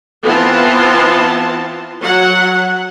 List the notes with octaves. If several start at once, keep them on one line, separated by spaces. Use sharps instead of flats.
E3 B3 C4 F4 A5
F#3 F#5